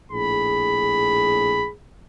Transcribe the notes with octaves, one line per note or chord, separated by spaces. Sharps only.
A#1 A2 G#4 B5